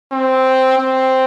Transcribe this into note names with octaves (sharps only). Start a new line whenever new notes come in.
C4
C4